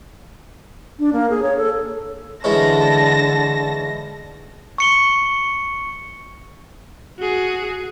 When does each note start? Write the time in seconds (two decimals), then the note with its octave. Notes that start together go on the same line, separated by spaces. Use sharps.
0.99 D4
1.13 A#3
1.30 G#4
1.43 C#5
1.57 A4
2.44 D3 E3 G#3 C#4 A5 A#6
4.78 C#6 C#7 G7
7.19 F#4 G#4